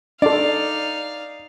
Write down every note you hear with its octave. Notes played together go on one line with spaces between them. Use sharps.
D4 D#4 A4 D5 F5